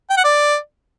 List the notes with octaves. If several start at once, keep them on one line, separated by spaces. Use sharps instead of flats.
G5
F#5
D5